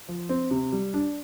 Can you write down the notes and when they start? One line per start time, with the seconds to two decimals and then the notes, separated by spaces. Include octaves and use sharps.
0.08 F3
0.29 C4
0.51 C3
0.72 G3
0.94 D4